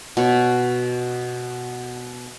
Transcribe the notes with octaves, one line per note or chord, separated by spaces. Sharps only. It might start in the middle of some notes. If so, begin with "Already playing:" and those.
B2 C#5